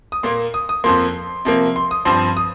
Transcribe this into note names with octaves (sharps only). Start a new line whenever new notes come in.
D#6
A#2 A#3 C6
D#6
D#6
F2 F3 A#3 C6
C3 F3 A#3
C6
D#6
G2 F3 C4 C6
D#6